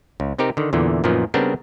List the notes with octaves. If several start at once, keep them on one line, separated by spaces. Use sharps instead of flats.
C#2
C3 C4 D#4 G4 A#4
D3 D#3
E2 A#2 D3 E3
F#2 A#2 D#3 F3 B3
C#3 G3 B3 C4 D4 A#4